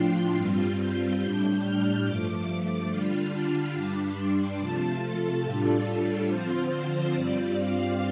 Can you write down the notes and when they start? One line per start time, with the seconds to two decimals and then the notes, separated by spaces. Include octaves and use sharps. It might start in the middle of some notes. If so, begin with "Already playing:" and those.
Already playing: A2 F3 D4 F4 G5 C6
0.36 G2 G3 C4 F4 G6
1.20 A2 G3 D4 G6
1.62 F6
2.04 G2 F3 A3 D6
2.89 D3 G3 D4 F4 F6
3.32 F6
3.74 G2 G3 D4 D6
4.16 C6
4.59 C3 F3 A3 F4 A5
5.02 A4
5.43 A2 G3 D4 F4
6.28 D3 F3 C4 F4 C5
7.14 G2 G3 C4 F4 D5
7.55 F5